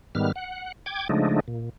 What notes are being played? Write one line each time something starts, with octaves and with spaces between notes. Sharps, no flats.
G#2 D#3 G3 B3 F6
F#5
G5 D6 G#6
C#3 F3 G#3 A3 D4 D#4
A#2